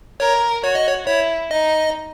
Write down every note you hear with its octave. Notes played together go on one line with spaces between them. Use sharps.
A#4 C#5
F#4 C#5
D#5
C#5
E4 C#5
D#4 D#5